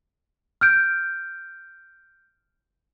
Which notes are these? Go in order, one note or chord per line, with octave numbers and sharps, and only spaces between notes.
F6 G6 D7